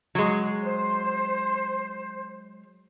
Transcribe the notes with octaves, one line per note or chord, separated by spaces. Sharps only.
F#3 G#3
C5